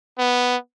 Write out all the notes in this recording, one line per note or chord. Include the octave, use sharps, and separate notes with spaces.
B3